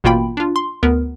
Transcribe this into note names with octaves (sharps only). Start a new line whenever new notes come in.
A1 B2 A#3 F4 G5 B5
D4 F4
C6
D2 B3 A#4